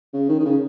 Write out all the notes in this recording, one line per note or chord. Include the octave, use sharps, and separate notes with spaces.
C#3
D#3
D#3
C#3